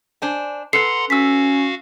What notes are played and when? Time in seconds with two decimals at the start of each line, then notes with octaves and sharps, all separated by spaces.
0.22 D4 C5 G#5
0.73 A4 B4 F#5 A#5 C6 C7
1.10 C#4 F#4 F5 E6 B6